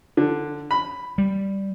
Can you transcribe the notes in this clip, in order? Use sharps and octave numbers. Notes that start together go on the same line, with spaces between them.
D3
B5
G3